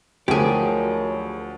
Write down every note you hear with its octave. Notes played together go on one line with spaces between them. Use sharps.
D2 D3 D#3 F3 F#3 G4 G#4